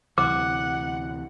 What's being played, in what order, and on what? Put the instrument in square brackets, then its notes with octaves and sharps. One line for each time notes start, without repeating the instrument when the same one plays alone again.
[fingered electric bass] D2 C3 E3 [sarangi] F#5 [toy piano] D6